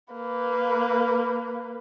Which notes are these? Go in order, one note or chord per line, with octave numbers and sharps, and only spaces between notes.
A#3 B4